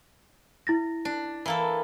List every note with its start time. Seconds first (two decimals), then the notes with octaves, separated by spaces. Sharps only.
0.67 E4 A6 A#6
1.05 D4
1.46 E3 A#3 A4